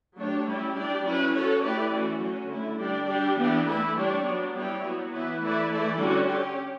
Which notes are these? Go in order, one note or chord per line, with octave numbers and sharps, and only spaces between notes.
F#3 A3 D4 G4 C#5
G3 C#4 E4 G4
G3 D4 G4 D5
F#3 C#4 E4 B4
C#4 F#4 A4 C#5
A3 E4 G4 B4 D5
E3 A3 C#4 F#4
F#3 C#4 F#4
D3 A3 E4
G3 D4 G4 D5
G3 D4 G4
E3 B3 D4 G4
A3 E4 B4
G3 D4 G4 C#5
F#3 B3 D4
G3 B3 E4 G4 C#5
F#3 B3 F#4
E3 B3 E4 B4
E3 A3 E4 B4 D5
E3 A3 E4 A4 D5
D3 G3 C#4 F#4
C#4 G4 C#5